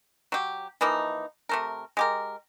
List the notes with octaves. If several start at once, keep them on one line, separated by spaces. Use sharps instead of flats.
F#3 G4
E3 F3 A#3 D#4
C3 A3 A#4
G#3 G4 A#4